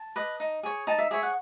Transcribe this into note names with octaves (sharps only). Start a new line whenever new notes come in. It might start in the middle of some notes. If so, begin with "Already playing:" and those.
Already playing: A5
B4 D#5
D#4
G#4 C#5
D#4 A5
E5
G#4 C#5 E5
F#5